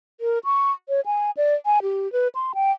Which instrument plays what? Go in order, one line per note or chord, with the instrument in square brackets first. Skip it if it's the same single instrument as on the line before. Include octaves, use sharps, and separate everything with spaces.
[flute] A#4
C#6
C#5
G#5
D5
G#5
G4
B4
C6
G5